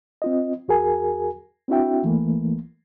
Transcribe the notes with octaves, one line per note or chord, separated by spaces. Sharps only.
C4 F4 D#5
E2 F#4 G#4 A#4 G#5
C4 D4 E4 F#4 E5 G5
C#2 E3 A3 A#3